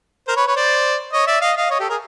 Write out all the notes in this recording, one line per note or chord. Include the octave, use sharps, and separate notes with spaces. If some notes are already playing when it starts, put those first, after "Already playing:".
A#4 C5
B4 C#5
B4 C#5
C5 D5
C#5 D#5
D5 E5
D#5 F5
D#5 F5
C#5 D#5
G4 A4
G#4 A#4